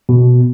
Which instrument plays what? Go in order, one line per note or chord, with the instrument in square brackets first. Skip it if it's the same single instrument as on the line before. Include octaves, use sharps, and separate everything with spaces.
[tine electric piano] B2